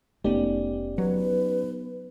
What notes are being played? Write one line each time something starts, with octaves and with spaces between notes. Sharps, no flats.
F1 A3 B3 C#4 D#4 G4 D5
F#3 B4